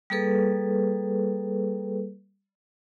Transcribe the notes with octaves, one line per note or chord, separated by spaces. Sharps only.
G3 A#3 G#4 A4 B4